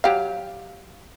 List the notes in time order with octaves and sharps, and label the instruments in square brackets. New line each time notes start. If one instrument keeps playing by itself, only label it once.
[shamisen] F#3 G4 F5